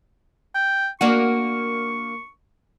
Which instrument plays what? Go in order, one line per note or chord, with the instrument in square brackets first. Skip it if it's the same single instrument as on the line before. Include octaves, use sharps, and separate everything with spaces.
[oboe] G5
[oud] A#3 D4 F#4 [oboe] C#6